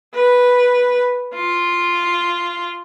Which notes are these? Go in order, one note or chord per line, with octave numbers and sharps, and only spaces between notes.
B4
F4